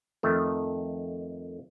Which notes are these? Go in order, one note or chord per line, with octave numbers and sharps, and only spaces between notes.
F2 D#3 A3